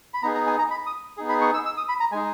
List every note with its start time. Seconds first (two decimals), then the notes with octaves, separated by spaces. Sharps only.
0.14 B5
0.23 B3 D#4 G#4 A#5
0.35 A#5
0.46 G#5
0.59 A#5
0.71 B5
0.86 D#6
1.17 B3 D#4 G#4
1.29 B5
1.41 C#6
1.54 E6
1.65 E6
1.77 D#6
1.89 B5
2.00 A#5
2.12 G#3 D#4 G#4 G#5